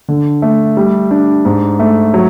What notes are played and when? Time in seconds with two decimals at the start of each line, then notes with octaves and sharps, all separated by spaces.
0.08 D3
0.42 A3
0.77 G3
1.11 D4
1.45 G#2
1.79 A3
2.14 F#3